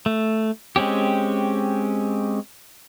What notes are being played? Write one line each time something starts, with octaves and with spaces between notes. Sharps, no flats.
A3
G#3 C4 C#4 G4